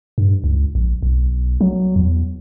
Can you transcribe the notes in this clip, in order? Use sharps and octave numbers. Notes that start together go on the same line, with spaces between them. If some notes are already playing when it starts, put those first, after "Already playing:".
G2
C#2
A#1
B1
F#3
E2